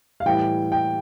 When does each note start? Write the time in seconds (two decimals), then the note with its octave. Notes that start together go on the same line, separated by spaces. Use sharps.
0.20 F5
0.26 A2 E3 G3 G5
0.72 G5